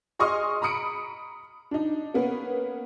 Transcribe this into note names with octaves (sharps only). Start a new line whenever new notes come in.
G#4 D#5 C6 C#6 D#6 F6
A#5 B5 D#6 C#7 D7
D4 D#4
A#3 B3 C#4